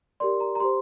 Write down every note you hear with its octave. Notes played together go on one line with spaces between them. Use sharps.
G4 A#4 D5 C6
A#5
A#5
G4 C5 C6